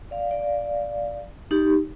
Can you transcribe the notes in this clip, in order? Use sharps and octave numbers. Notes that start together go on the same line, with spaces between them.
D5 F5
D5 F5
D#4 G4